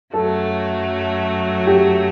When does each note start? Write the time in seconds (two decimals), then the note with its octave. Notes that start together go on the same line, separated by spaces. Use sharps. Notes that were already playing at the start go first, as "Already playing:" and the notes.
0.13 F#2 F#3 A3 A4
1.67 G4